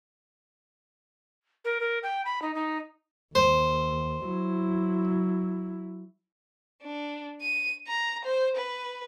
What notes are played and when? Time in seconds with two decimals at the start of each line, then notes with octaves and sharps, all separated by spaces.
1.65 A#4
1.80 A#4
2.03 G5
2.25 B5
2.42 D#4
2.55 D#4
3.35 D#2 C5
4.26 F#3 E4
6.83 D4
7.42 D#7
7.87 A#5
8.25 C5
8.56 B4